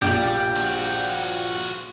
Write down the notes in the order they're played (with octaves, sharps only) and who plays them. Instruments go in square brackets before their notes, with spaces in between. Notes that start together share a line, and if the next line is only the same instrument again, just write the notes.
[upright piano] A#1 A#2 [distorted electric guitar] G3 [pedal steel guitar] G4
[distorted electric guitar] F3 F#4